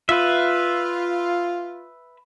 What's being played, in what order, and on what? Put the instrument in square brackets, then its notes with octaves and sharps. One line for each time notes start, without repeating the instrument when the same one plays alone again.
[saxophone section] F4 [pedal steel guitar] B4 E5